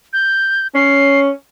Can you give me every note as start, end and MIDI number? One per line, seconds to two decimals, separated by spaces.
0.13 0.67 91
0.75 1.30 61
0.75 1.20 96